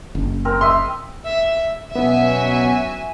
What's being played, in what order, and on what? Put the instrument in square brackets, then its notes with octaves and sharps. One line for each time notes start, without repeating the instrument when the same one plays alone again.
[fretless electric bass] F#1
[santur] C4 A#4
[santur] D#5 E5 [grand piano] C6
[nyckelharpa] E5
[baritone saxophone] B2 [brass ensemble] F#3 C#4 F#4 [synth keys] B3 [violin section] E5 G#5